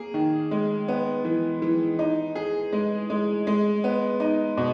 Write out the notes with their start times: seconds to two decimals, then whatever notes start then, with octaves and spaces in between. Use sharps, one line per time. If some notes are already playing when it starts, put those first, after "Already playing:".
Already playing: A#3 G#4
0.14 D#3
0.51 G#3
0.88 B3
1.25 E3
1.62 E3
1.99 D#4
2.35 G#4
2.72 G#3
3.10 G#3
3.47 G#3
3.84 B3
4.20 D#4
4.57 B2